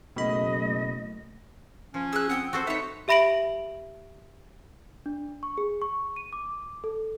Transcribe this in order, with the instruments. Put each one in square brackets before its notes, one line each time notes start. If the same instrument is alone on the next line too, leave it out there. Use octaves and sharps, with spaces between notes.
[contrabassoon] F#1 [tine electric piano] B2 B5 [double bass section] F#3 A3 [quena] D#5
[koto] F3 [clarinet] C#4
[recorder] G#4 [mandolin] E6 F#6
[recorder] C4 [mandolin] F#5 G5 D#6
[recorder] C4 [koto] F#4 A4 C5
[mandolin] B3 C#5 [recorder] D#4 [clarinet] E5
[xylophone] G4 E5 B5 A#6 D7 F#7
[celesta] D4
C#6
G#4
C#6
D#7
D6
A4